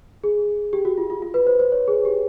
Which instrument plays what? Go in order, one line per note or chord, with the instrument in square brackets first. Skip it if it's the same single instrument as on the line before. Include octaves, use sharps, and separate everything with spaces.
[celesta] G#4
G4
F#4
F4
F4
F4
B4
C5
C5
C#5
G#4
G4